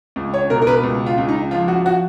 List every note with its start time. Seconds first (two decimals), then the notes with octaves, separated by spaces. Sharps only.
0.16 C#2
0.34 C#5
0.50 B2 A#4
0.62 A#4
0.67 B4
0.83 C#2
1.06 F4
1.18 C#2
1.29 D#4
1.51 F3 F4
1.68 F#4
1.85 F3 F#4